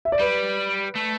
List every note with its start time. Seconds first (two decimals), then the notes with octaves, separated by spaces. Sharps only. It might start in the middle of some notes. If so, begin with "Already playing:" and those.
0.05 E5
0.12 D5
0.19 G3 B4
0.95 A3